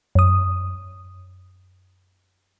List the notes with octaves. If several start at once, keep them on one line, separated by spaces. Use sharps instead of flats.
F#2 D#6